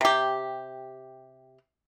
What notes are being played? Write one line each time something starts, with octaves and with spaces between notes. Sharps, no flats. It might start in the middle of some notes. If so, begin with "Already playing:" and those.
C3 G4